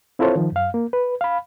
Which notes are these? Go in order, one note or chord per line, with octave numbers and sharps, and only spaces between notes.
C4 E4 F4 A4 C5 C#5
D#3 F3
F#2 F5
A#3
B4
F5 B5